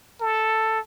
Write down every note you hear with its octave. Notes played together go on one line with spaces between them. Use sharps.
A4